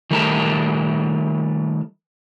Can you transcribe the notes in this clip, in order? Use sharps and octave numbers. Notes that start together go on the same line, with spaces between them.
D#3 G3 A3 A#4 F#5 A5